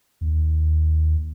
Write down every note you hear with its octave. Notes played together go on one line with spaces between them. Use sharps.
D#2